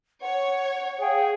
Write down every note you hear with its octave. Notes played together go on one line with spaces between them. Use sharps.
C#5 F#5
G#4 F5 G5